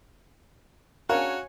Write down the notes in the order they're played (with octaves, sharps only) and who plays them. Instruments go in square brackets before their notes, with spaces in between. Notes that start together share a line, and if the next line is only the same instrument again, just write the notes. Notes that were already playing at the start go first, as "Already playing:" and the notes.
[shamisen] C#3 D4 A#4 [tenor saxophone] F#4 [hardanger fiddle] C#5 G#5 [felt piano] F5